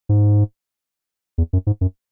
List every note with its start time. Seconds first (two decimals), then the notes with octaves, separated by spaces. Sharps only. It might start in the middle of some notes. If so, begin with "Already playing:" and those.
0.09 G#2
1.38 E2
1.53 F#2
1.67 G#2
1.81 F#2